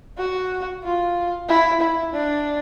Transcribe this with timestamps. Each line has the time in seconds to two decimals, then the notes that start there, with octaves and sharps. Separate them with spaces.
0.18 F#4
0.84 F4
1.48 E4
1.80 E4
2.13 D4